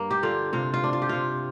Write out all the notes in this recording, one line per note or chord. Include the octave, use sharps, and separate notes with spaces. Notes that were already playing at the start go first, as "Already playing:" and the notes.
Already playing: G2 G3 A#3
G4
D3 F4
C3 F4
F4
D4
F4
G4
C3 F4